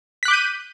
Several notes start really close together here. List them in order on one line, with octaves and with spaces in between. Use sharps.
B6 F#6 D6 G6 D#7